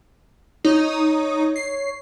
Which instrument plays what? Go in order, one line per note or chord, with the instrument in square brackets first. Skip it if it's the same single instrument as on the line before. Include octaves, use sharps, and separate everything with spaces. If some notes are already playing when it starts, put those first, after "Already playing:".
[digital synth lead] D#4 [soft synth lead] C#5
[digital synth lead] C7